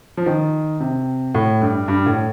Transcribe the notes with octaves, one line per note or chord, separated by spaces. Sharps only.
F3
D#3
C3
A2
G2
G2
A2